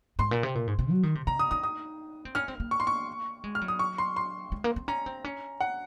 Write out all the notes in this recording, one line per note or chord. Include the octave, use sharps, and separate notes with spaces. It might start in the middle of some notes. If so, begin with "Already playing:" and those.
G#2 C6
A#2
C3
A#2
G#2
C3
F#3
D#3
C3
C#3 A#5
D#6
D#4 D#6
D#6
C4
C#4 F6
C4
A#3
C#6
C6
C#6
G#3
F6
F#3
D#6
C#6
C6
C6
G#3
A#3
C4
C#4 A#5
C4
C#4
F#5